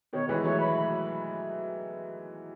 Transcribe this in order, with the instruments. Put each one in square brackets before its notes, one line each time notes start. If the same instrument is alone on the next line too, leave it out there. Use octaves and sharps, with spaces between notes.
[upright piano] B2 D#3 [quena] C#5
[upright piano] E3 G#3 [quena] B4
[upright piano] F#3 A3 [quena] C#5
[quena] B5